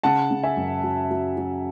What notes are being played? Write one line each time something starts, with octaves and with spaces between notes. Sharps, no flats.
C#3 F#5 A5
C#3
E5 G#5
F#2
F#3
F#3
F#3